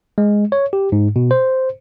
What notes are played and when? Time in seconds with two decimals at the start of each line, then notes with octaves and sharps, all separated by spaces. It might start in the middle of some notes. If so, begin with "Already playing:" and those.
0.18 G#3
0.52 C#5
0.73 G4
0.92 G#2
1.16 B2
1.31 C5